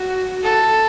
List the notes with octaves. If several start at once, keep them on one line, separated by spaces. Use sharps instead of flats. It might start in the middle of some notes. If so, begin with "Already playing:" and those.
Already playing: F#4
A4